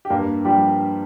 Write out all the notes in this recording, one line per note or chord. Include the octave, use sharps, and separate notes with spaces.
G4
G2 A#3 A#4
F3 G3 G4